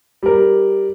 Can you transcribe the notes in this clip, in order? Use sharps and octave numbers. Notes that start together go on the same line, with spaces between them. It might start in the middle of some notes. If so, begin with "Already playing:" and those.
G3 A#4